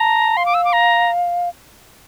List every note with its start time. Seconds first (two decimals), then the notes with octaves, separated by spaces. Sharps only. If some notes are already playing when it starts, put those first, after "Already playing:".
Already playing: A5 A#5
0.37 F5 C6
0.46 D6
0.54 E6
0.64 D6
0.73 A#5